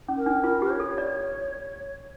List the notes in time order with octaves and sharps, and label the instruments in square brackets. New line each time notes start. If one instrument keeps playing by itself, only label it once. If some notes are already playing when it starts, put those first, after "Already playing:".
[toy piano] C#4
[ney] A#4
[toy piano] D4
[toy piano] F4 [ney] A#4
[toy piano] G4
[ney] C#5
[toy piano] A4
D5